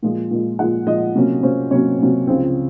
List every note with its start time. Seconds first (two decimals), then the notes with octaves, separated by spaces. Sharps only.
0.03 A#2 F3 G#3
0.31 A#2 F3 G#3
0.59 A#2 F3 G#3 F#5
0.87 A#2 F3 G#3 D#5
1.15 C3 F#3 A#3 C#4
1.43 C3 F#3 A#3 C#4 C5
1.71 C3 F#3 A#3 C#4 C#5
1.99 C3 F#3 A#3 C#4
2.27 C#2 C#3 F3 C4